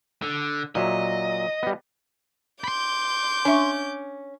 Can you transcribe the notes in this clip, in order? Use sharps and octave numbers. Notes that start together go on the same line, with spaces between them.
D3
A#2 F#3 D#5 E5
G3 B3
B5 C6 D6 G6
C#4 D4 E5